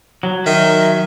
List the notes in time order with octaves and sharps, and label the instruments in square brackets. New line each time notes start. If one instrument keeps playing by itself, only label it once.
[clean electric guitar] F#3
[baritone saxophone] D#3 [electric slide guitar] E5